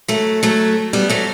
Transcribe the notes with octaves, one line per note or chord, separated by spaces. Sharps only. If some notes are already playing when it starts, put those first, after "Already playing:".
F#3 A3
F#3 A3
G3 B3
F#3 A3